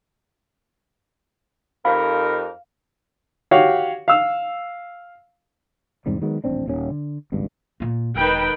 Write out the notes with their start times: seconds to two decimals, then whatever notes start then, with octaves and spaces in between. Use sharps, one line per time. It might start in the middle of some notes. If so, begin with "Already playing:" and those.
1.85 F2 D#4 G4 A#4 F5 B5
3.51 F#4 G4 C#5 F5
4.08 F5 E6
6.06 E2 G#2 C3 G3
6.22 D#3 F#3 G#3 B3
6.44 D#1 A1 C4 D4
6.67 D#1 D#2 C#4
6.90 D3
7.32 D1 G#1 C#2 G2
7.80 A#2 A#3
8.16 E1 D#3 B4 G5